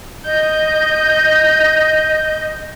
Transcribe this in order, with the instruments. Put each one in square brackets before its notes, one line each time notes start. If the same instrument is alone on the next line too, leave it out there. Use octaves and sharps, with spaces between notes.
[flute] D#5 [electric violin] G6